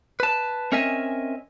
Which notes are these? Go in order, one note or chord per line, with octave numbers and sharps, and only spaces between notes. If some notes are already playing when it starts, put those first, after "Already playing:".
B4 A5
C4 C#4 A#4 D#5 E5 G#5